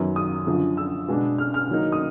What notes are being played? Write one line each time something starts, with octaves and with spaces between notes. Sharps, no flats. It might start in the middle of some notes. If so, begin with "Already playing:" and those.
Already playing: F#2 D#3 F#3 B3
D#6
F#2 D3 F3
E6
B2 G#3 B3 D4
F6
F6
D#3 F#3 A#3 D#4
D#6